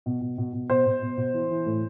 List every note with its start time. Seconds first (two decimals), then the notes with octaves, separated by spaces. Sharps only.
0.06 B2
0.21 B2
0.38 B2
0.53 B2
0.70 B2 C5
0.86 B2
1.02 B2
1.17 B2
1.33 E3
1.50 E3
1.66 A2